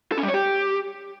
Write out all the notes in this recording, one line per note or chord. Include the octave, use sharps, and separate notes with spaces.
A4
C#4
G3
C#5
G4